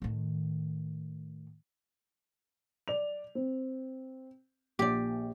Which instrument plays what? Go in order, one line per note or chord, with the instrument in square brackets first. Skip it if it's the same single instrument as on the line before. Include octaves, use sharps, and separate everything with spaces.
[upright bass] A2 D#3
[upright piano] D5 F7
C4
[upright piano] A#1 [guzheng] G4 D5